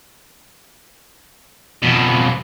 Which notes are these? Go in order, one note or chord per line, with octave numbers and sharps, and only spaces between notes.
F2 B2